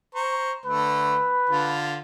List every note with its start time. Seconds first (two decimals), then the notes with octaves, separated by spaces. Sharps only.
0.15 C5 A#5 C#6
0.66 D3 A3 B4
1.50 D3 F4